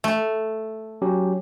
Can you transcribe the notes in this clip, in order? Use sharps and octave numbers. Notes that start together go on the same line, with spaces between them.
A3
F#3 C#4 G4